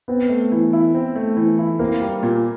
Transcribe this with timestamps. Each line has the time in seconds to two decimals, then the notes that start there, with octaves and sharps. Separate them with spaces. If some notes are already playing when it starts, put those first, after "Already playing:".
0.08 B3 C4
0.29 A3
0.52 E3
0.73 E4
0.95 C4
1.15 A3
1.37 E3
1.59 E4
1.79 A#3 C4
2.01 G3
2.23 A#2